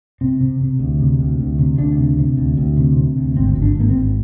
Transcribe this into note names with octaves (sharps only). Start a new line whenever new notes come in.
C3 C4
C3
C3
D2
C3
D2
D2
C3
D2 D4
C3
C3
D2
D2
C3
C3
D2
G#1 C4
G#1
D4
G#1 A#3
C4
G#1